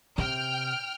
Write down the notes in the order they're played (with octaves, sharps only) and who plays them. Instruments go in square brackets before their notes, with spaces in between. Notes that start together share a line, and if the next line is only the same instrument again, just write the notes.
[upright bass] C3 [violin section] G5 F6